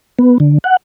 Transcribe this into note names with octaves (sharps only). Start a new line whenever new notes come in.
B3
D3
F#5